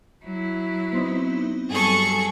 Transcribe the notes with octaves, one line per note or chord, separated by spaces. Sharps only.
F#3 E4
B3 C4 D#4
G2 F#3 G#4 A4 C#6